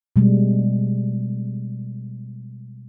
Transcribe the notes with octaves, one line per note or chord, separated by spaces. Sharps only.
B2 G3 G#3